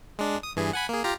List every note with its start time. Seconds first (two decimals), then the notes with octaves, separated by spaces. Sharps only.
0.19 G#3 D4
0.43 D#6
0.57 G2 E3 G#4
0.73 F#5 G#5 B5
0.89 A#3 G#4
1.04 F4 G4 A#5